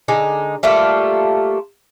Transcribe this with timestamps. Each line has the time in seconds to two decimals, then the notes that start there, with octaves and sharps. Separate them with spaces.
0.08 D3 G#3 D#4
0.63 G3 A3 A#3 F4